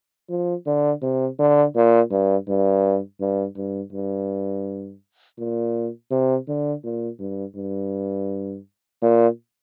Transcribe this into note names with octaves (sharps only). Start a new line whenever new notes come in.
F3
D3
C3
D3
A#2
G2
G2
G2
G2
G2
A#2
C3
D3
A#2
G2
G2
A#2